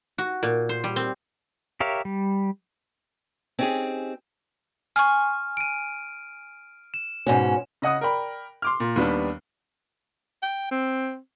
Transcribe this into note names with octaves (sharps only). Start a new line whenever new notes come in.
F#4
A#2
C5
G3
C4
G4 A#4 C#5 E5 F5
G3
C4 C#4 D#4 F4 G4 G#4
G#5 C6 C#6 F6
D7 D#7
E7
G#2 B2 C#4
C#3 D#5 F#5 D#6
A#4 D5 G5 B5
C6 D6 F6
A#2
D#2 D#3 G3 B3 D4
G5
C4